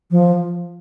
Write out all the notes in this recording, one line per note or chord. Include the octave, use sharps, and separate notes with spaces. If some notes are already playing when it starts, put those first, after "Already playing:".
F3